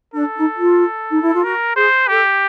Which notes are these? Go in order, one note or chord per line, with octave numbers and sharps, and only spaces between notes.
D4 A4
D#4
F4
D#4
E4
F4
F#4 A#4
G#4 C5
G4 A4